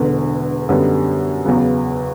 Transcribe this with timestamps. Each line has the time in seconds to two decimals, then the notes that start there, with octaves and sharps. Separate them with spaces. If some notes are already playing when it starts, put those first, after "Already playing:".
Already playing: E1 E2 D3
0.69 F#2 D3 G3 B3
1.46 E2 C#3 F#3 B3